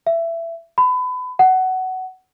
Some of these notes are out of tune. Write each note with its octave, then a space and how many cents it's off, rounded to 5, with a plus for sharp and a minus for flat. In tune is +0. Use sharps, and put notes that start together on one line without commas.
E5 +20
B5 +30
F#5 +15